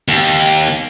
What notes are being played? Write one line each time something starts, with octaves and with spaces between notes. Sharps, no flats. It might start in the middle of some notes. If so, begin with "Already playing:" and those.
D#2